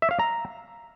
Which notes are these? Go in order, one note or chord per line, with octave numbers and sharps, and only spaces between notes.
E5
F5
A#5